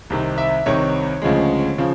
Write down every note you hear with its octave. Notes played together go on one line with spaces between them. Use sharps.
C2 C3 D#3
E5
C2 C3 D#3 C#5
D2 C#3 F3 G#3
C#3 F3